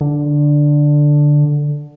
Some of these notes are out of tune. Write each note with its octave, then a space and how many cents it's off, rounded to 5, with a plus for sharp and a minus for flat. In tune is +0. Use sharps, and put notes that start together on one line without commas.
D3 +0